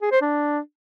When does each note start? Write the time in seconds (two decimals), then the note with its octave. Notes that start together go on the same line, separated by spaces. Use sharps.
0.02 G#4
0.12 C5
0.22 D4